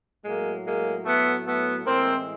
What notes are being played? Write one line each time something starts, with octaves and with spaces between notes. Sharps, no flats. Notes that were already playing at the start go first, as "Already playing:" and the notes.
A2 F#3 G#3 A#3
G#3 A#3
A3 B3
A3 B3
A2 E3 G#3 A#3 C4